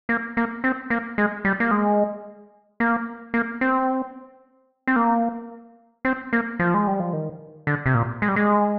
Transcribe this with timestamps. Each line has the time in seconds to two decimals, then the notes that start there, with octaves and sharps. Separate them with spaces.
0.09 A#3
0.37 A#3
0.64 C4
0.90 A#3
1.18 G#3
1.45 G3
1.60 A#3
1.71 G#3
2.80 A#3
3.34 A#3
3.61 C4
4.87 C4
4.96 A#3
6.05 C4
6.33 A#3
6.59 F3
6.74 G#3
6.87 G3
7.00 F3
7.13 D#3
7.67 D3
7.86 C3
7.95 A#2
8.22 G#3
8.28 G3
8.36 G#3